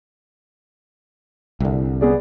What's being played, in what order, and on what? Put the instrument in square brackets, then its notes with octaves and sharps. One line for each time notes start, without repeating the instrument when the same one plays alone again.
[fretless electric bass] C2 D3
[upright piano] B3 G#4 D5